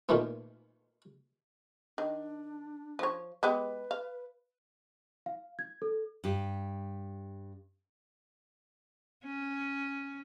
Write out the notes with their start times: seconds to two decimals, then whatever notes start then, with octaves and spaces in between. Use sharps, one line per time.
0.09 A#2 D#3 A3 B3
1.98 D#3 D4
2.99 F3 C#5
3.43 G#3 B3 G4 B4
3.91 F5
5.26 F5
5.59 G#6
5.82 A4
6.24 G2 G4
9.24 C#4